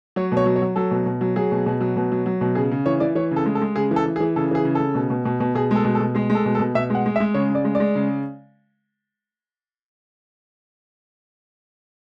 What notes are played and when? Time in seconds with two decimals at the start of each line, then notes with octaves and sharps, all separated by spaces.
0.16 F#3 C#5
0.32 B2 C#5
0.46 F#3
0.56 C#5
0.62 F#3
0.76 F#3 A4
0.91 B2
1.06 B2
1.21 F#3
1.36 F#3 G#4
1.52 B2
1.66 B2
1.81 F#3
1.97 B2
2.12 F#3
2.26 F#3
2.41 B2
2.55 C#3 G#4
2.71 C#3
2.86 E3 C#5
3.00 E3 D5
3.15 E3 C#5
3.31 C#3 A4
3.46 G#3
3.55 A4
3.61 G#3
3.76 C#3 G#4
3.91 E3
3.96 A4
4.06 E3
4.16 G#4
4.20 E3
4.36 C#3 A4
4.51 E3 G#4
4.65 C#3
4.75 C#3 A4
4.95 B2
5.10 B2
5.25 B2
5.40 B2
5.55 B2 G#4
5.71 G#3 A4
5.85 B2
5.95 A4
6.00 B2
6.15 G#3 G#4
6.30 G#3
6.35 A4
6.46 B2
6.55 A4
6.60 B2
6.75 B2 E5
6.90 G#3 F#5
7.06 G#3
7.16 E5
7.20 G#3
7.34 C#3 C#5
7.50 C#3
7.55 D5
7.65 G#3
7.75 D5
7.80 G#3
7.95 C#3